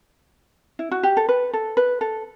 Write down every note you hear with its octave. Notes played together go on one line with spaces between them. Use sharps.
E4
F#4
G4
A4
B4
A4
B4
A4